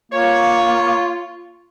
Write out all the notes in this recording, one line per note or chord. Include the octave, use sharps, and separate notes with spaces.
A#3 F4 C#5